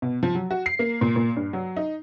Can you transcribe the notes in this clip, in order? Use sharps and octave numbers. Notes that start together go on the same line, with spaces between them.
B2
F3
F#3
F#4
C7
A#3
A#2
A#2
G2
F#3
D#4